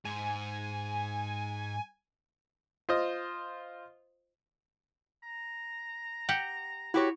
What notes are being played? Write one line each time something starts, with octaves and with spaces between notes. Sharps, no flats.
G#2 G#5
F4 C5 D#5
A#5
G4 F#5 G5
E4 F#4 G4 C#5